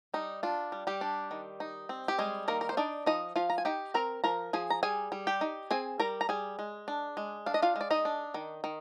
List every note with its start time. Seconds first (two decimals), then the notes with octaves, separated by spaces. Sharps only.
0.14 G3 D#4
0.43 D4 F4
0.72 G3
0.87 G3 G4
1.01 D4
1.31 D#3
1.60 D#4
1.89 C4
2.08 G4
2.19 G3 G#3 G#4
2.48 D#3 A#3 A#4
2.61 A#4
2.69 C5
2.77 D4 D#4 D5
3.06 F3 D#4 D#5
3.36 F3 F4 F5
3.50 A#5
3.58 G#5
3.65 D#4 G4 G5
3.94 C4 A#4 A#5
4.24 F3 A#4 A#5
4.53 F3 G#4 G#5
4.70 A#5
4.83 G3 G#4 G#5
5.12 G3
5.27 G4 G5
5.41 D#4
5.71 C4 G#4 G#5
6.00 G3 A#4 A#5
6.21 A#5
6.29 G3 G#4 G#5
6.59 G#3
6.88 D4
7.17 G#3
7.46 D4 F5
7.54 D#5
7.62 F4 F5
7.76 G#3
7.81 D5
7.90 D#4 D#5
8.05 D4
8.34 D#3
8.64 D#3